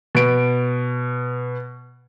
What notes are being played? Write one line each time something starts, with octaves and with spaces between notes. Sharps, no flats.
B2 D7